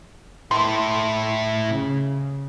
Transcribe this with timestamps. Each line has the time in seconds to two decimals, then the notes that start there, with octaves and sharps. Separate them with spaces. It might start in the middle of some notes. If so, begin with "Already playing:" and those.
0.51 A2 E4 C6
1.69 C#3